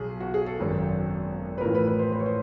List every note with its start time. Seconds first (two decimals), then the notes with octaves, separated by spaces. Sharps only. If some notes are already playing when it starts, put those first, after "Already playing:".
Already playing: B1 B2 G#4
0.20 F#4
0.34 G#4
0.46 A4
0.59 G#1 F#2 D#3
1.58 B4
1.61 A1 A2 F3 A#4
1.75 B4
1.87 B4
1.99 C5
2.12 B4
2.20 C#5
2.26 C5